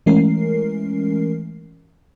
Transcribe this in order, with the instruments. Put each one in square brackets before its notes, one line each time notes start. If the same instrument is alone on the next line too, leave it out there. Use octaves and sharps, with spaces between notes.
[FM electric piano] E3 G#3 A3 C#4 A#4 C7